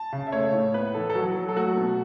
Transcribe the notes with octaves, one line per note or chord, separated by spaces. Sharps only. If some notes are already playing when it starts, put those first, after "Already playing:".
Already playing: A5
C#3
E5
A3 C#5
A2
B3 B4
E3 A4
A4
F#3 F#4
F#3
A4
A3 F#4
B2